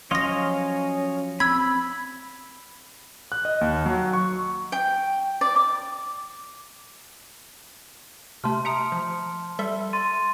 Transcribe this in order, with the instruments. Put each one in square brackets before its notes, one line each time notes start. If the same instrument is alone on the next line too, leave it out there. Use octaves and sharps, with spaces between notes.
[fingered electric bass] F3 F#3 [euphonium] C#4 [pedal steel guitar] C#5 D#5 F5 [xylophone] C6 A#6
[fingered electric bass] C4 [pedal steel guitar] B5 [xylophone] E6 G#6
[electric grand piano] F#6
D#5
D#2
F#3
C#6
[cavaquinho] G5
D5
D6
[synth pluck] C3 A3 [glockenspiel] A5 C6 F6
[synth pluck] E5 A#5 D#6 [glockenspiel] C#7 D7
[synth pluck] F3
G3 A4 E5
[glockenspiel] C6 A6 D#7